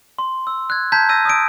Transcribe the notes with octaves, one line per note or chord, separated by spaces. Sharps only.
C6
E6
F#6 G#6
A5 A#5 G6 G#6 B6
E6 G6 A#6 D#7
D#6 E6 D7